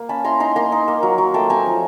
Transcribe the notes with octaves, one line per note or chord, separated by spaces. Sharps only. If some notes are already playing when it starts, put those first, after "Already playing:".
Already playing: A#3
C#4 A5 B5
E4 A#5 C6
D#4 A#5 C6
A#3 A#5 C6
D#4
A#3
F#3
F#3
A3 G5 A5
C4 G#5 A#5
F3